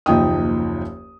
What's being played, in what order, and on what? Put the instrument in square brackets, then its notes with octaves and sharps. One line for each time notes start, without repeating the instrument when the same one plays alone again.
[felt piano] F#1 D#2 F3 D#4 G5 D#6